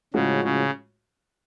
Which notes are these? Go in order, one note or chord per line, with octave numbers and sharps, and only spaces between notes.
A2 C#3 F3 G#3 C#4 F#4
C#3